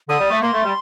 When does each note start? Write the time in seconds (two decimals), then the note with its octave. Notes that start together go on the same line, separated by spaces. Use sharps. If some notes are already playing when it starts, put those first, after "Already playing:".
0.09 D3 D#6
0.19 G3
0.31 A3
0.42 A#3 C6
0.53 A3
0.64 G3